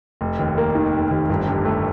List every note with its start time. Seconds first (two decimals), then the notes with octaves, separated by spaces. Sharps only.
0.21 F1
0.39 D#2
0.58 A#3
0.75 D#3
0.93 F1
1.11 D#2
1.30 G1
1.48 G2
1.65 A3